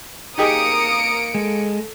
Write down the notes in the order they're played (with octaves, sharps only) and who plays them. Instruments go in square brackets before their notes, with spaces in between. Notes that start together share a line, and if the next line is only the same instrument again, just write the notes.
[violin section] A#3 C#7 D7 [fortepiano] D#4 G4 G#4 [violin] A#5 D#6
[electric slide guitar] G#3 [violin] A4